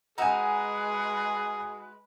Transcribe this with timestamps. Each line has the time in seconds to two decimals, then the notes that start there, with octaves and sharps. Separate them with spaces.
0.18 G#3 D#4 F#4 G#4 B4 E5 G#5 A#5